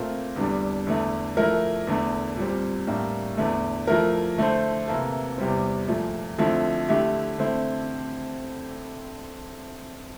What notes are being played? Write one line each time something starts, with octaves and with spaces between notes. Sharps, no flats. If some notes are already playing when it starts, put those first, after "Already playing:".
Already playing: A#2 A3 C4 F4 A#4
E2 D3 G3 D4
E2 D3 A3
F3 A3 E4 A#4
E2 D3 A3
A#2 G3 C4
A2 G3 A#3 D4
E2 D3 A3
F3 A3 E4 A#4
D3 A3 E4 A4 C5
C3 E3 A#3 E4 A4
E2 C3 G3 C4
A#2 F3 A3
F2 D3 F3 A3 E4
D3 A3 E4 G4
D3 A3 C4 E4